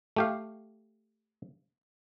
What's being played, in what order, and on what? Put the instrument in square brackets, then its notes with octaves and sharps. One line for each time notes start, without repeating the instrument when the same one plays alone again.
[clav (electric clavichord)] A3 G4 F5